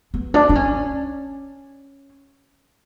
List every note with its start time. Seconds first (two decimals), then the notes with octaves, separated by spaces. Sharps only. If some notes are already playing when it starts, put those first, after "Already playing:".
0.14 B3
0.34 D4
0.49 D4
0.55 C#4